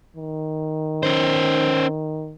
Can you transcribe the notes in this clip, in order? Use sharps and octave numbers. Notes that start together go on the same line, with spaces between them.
D#3
C#4 C5